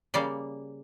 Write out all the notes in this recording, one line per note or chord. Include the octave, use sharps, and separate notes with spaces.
C#3 G3 A#3 D5